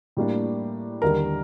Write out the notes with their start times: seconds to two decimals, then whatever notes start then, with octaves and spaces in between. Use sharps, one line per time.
0.17 A2 G3 A#3 D4
1.02 D#2 D3 G3 A#4